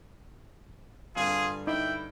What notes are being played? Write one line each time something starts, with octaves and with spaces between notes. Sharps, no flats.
G2 D3 F4 G#4
D#4 E4 G5